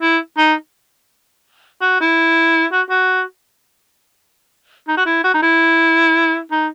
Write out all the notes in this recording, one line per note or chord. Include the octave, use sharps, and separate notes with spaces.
E4
D#4
F#4
E4
F#4
F#4
D#4
F#4
E4
F#4
D#4
E4
D#4